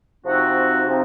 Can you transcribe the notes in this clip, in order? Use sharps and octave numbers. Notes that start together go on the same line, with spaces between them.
C3 F3 C4 D#4 F#4
C3 F3 C4 D#4